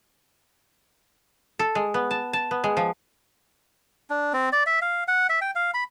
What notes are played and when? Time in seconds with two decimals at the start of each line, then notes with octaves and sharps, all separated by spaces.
1.59 A4
1.75 G#3
1.94 B3
2.11 A5
2.33 A5
2.51 B3
2.64 G#3
2.77 F3
4.10 D4
4.33 C4
4.52 D5
4.66 E5
4.82 F5
5.08 F#5
5.29 E5
5.41 G5
5.55 F5
5.74 B5